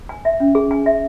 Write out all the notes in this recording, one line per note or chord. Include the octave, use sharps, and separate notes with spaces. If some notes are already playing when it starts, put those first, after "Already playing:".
G#5
E5
C#4
G#4
G#5
E5